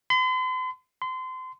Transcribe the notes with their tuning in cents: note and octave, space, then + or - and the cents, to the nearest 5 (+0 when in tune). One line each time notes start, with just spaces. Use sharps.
C6 -45
C6 -30